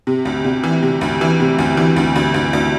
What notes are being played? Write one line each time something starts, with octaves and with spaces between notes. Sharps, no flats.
C3
D2
C3
E3
C3
D2
E3
C3
D2
E3
D2
D2
D2
D2